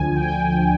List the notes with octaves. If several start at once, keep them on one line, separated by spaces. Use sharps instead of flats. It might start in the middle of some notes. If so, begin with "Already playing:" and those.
Already playing: D2 D3 F3 G#5
G5
G#5